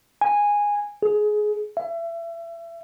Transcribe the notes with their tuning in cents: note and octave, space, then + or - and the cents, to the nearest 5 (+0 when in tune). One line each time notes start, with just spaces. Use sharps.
G#5 -10
G#4 +20
E5 +30